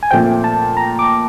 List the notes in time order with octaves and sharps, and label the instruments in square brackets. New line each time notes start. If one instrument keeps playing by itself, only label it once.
[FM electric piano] G#5
[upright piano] A#2 F3 A3 C4 [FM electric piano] G5
[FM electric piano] A5
A#5
D6